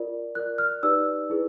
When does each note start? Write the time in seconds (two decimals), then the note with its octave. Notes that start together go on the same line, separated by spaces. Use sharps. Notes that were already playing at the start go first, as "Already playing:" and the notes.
Already playing: F4 A#4 D5
0.35 F4 A#4 D5 F#6
0.58 F6
0.83 D#4 G4 B4 D5 E6
1.30 E4 G#4 B4